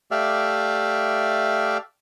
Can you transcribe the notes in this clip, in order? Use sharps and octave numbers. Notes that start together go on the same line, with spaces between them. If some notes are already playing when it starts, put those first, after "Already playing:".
A3 G4 D5 E5 F5